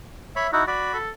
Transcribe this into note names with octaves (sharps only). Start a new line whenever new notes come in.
C#5 E5 B5
D#4 E4 F#4
F#4 D5 B5
A4